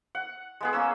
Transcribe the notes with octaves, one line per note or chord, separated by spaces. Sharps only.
F#5
G#3 B3 G#4
A#3 C#4 E6